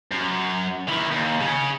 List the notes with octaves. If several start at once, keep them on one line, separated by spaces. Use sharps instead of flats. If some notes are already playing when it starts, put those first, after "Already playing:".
F#2
D#3 E4
D#2
C#3 C#4